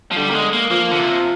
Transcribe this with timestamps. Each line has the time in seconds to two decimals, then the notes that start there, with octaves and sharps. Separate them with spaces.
0.11 F3
0.17 D3 G3
0.30 A#3
0.35 G#3
0.53 A#3
0.71 F3 A#3
0.91 D3
0.98 C3